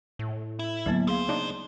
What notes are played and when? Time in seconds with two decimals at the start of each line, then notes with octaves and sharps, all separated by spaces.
0.19 A2
0.59 E4
0.86 D2 F#3 A#3 B3
1.07 G#3 G#4 C5 F5
1.28 C#3 D4 D#4